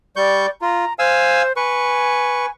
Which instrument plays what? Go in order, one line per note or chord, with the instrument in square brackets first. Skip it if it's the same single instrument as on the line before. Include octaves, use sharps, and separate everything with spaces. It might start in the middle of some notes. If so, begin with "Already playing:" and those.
[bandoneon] G3 C#6 G6 [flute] D5
[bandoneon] F4 [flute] A#5
[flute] C5 [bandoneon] F5 G#5 E6
[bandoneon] B4 C#6 [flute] G#5